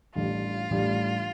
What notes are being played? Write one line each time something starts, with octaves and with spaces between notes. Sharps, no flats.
A1 A2 G3 D4 F4
A1 A2 G3 D4